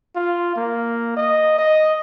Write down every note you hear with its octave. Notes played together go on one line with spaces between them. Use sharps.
F4
A#3
D#5
D#5